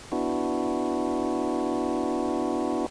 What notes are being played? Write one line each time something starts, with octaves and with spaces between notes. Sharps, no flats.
B3 D4 E4 F#4